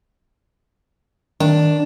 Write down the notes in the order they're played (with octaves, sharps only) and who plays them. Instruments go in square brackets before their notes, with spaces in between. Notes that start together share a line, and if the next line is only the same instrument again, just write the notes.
[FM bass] D#3 [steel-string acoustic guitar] D4